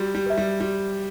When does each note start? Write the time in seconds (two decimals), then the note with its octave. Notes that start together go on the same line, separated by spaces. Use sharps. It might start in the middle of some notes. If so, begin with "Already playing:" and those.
Already playing: G3 F#4
0.15 G3
0.26 B4 E5
0.37 G3
0.60 G3 F#4